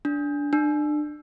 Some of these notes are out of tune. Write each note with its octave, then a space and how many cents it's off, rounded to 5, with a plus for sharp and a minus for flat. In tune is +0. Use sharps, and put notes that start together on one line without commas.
D4 -15
D4 +30